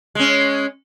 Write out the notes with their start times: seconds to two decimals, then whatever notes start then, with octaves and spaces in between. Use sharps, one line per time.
0.15 G#3 C#4